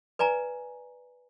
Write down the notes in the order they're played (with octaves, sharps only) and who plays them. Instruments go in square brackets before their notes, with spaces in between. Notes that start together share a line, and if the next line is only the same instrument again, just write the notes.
[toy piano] B4 D5 G#5 A#5